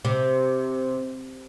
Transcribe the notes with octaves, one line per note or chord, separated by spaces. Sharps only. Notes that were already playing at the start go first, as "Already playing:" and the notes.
C3